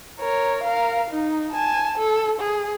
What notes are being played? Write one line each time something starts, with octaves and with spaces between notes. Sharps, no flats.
A#4 C#5
A#4 F5
D#4
G#5 A5
A4
G#4